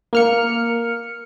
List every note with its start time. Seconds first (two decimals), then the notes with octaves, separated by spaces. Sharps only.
0.13 A#3 F6 C#7